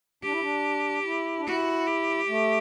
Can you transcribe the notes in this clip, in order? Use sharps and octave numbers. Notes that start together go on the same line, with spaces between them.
D4 G4
E4
D4
E4
D4
E4 F#4
G4
A3